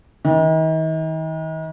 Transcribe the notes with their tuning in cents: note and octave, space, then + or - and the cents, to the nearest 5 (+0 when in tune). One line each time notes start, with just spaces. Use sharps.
D#3 +40